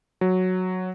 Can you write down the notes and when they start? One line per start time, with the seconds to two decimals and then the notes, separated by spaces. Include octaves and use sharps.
0.21 F#3